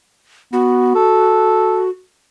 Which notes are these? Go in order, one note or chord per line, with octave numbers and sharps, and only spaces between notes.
B3 F#4
A4